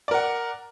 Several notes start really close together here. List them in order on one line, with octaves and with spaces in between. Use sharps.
D5 A#4 F#5